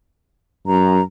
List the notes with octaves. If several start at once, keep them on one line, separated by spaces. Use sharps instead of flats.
F#2 A#5